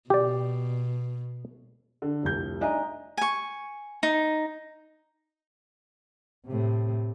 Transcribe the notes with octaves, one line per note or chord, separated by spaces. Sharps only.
B2 G4 D5
D3
F1 C2 G6
D4 D#4 G#4 E5 A#5
G#5 C#6
D#4
A2 C3